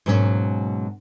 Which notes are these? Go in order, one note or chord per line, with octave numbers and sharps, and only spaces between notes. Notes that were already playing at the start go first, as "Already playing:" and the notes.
G#2 B2 F#3 A#3 C4 C#4